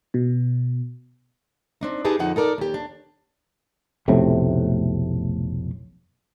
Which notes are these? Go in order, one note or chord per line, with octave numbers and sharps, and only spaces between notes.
B2
C4 D4 D#4
D#4 G4 G#4 B4 A5
F2 D3 D#4 F#5
D#4 A4 A#4 D5
D#2 G4
D4
F1 B1 A2 C3